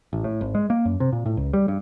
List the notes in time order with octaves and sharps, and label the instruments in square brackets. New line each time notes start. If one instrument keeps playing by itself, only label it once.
[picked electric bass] A1
A2
G#1
G#3
A#3
F#2
C3
A#2
A2
C#2
G3
G2